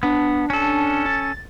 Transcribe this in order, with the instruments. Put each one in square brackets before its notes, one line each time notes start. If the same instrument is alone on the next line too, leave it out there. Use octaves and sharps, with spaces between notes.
[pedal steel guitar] B3 [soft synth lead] D4
[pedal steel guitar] C#4 A4
[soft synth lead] A6